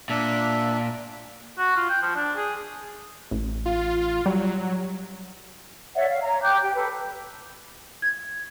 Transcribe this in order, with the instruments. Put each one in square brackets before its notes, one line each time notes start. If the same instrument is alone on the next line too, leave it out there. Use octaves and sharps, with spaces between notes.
[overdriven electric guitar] A#2 [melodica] D4 E5
[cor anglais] F#4
F4
G5
F3
D4
G#4
[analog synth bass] A1
[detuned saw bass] F4
[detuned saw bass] F#3 [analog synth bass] G3
[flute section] C#5 D5 E5 F#5
F5
C#5 A#5
G5 D6 F#6 G6
G4 G5
A4 B4
[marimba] G#6